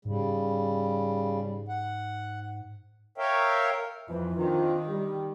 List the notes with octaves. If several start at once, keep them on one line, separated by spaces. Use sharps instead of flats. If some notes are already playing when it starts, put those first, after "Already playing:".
G#2 C#3 G3
F#5
A#4 C#5 E5 F5 G5
F2 E3
D#3 C4 D4 F4
G3